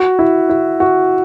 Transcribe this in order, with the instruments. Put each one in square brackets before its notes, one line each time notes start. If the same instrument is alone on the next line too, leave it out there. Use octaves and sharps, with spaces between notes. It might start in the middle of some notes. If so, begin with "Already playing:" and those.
Already playing: [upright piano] F#4
E4
E4
F#4